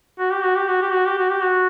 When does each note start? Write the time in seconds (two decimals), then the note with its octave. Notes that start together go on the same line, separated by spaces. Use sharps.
0.19 F#4
0.32 G4
0.44 F#4
0.56 G4
0.69 F#4
0.81 G4
0.93 F#4
1.06 G4
1.18 F#4
1.30 G4
1.42 F#4